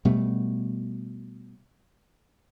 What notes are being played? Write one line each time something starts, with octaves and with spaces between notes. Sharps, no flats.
B2 G3 A3